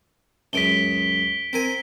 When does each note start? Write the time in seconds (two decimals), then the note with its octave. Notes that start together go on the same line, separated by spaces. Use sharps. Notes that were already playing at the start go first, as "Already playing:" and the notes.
0.53 C#2 F#2 G#3 B6 D7 G7
1.53 C4 A#4 G#5